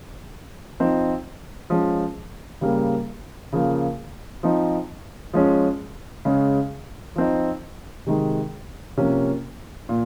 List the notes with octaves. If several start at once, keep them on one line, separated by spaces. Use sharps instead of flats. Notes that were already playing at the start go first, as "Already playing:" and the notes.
F3 C4 D#4
F3 G#3 C#4
C#3 G3 A#3
C#3 F3 A#3
F3 C4 D#4
F3 G#3 C#4
C#3 G#3 C#4
F3 C4 D#4
C3 D#3 G#3
C3 F3 A#3 C#4
A#2